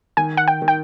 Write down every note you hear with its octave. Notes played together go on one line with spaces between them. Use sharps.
D#3 G#5
F#5
G5
D#3
G5